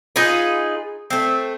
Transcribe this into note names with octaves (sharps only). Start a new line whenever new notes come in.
D#4 F4 G#4 B4
A3 C4